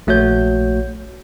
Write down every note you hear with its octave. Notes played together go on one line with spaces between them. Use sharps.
A#1 A3 F#4 C#5 G6